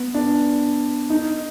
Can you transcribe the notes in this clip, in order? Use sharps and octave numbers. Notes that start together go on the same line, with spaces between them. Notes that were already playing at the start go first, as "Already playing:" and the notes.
Already playing: B3
D4
D#4